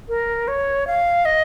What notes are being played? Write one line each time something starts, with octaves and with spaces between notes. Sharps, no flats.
A#4
C#5
F5
D#5